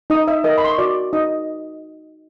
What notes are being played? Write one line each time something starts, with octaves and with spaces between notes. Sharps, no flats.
D#4 D#5 D#6
E5 E6
A#4 D#5 D#6
B5
C6
C#6
F#4 D5 D6
D#4 D#5 D#6